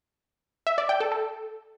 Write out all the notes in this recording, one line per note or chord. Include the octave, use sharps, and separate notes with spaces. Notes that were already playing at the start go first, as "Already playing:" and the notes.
E5
D5
G5
A4
A4